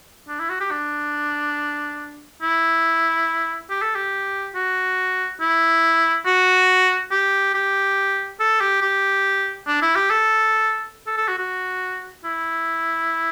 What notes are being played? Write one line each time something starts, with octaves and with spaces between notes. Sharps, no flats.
D4
E4
F#4
G4
D4
E4
G4
A4
G4
F#4
E4
F#4
G4
G4
A4
G4
G4
D4
E4
G4
A4
A4
A4
F#4
F#4
E4